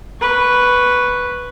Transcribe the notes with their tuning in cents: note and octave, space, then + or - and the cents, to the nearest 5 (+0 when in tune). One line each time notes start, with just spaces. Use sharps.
B4 +0 C#6 +0